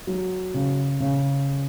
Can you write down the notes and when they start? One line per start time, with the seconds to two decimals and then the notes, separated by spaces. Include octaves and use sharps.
0.07 F#3
0.54 C#3
1.00 C#3